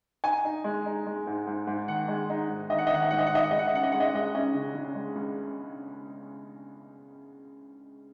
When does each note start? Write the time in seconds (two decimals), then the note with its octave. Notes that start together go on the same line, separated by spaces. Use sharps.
0.24 D#4 G#5
0.44 D#4
0.64 G#3
0.86 D#4
1.06 G#3
1.27 G#2
1.47 G#2
1.67 G#2
1.88 D#3 F#5
2.08 G#3
2.30 D#4
2.50 G#2
2.70 D#3 D#5
2.78 F#5
2.87 D#5
2.91 D#3 F#5
3.02 D#5
3.10 G#2 F#5
3.19 D#5
3.26 F#5
3.32 D#3 D#5
3.43 F#5
3.51 C#2 D#5
3.59 F#5
3.67 D#5
3.73 C#4 F#5
3.83 D#5
3.92 G#3 F#5
4.00 D#5
4.08 F#5
4.13 G#3 D#5
4.35 C#4 D#5
4.54 C#3
4.75 C#3
4.95 G#3
5.16 C#2